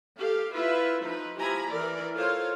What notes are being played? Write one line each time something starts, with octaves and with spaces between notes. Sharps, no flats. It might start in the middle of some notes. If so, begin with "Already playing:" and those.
G4 A4 F5
E4 F4 B4 E5
F3 D#4 B4
F3 E4 G4 G#5 A#5 B5
E3 A#4 D5
F4 A4 A#4 C5 C#5 F5